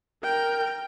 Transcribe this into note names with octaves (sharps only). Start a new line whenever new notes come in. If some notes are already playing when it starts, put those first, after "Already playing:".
A#4 G5